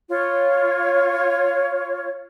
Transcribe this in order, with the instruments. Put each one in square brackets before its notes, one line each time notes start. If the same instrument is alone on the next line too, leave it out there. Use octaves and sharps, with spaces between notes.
[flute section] F4 C#5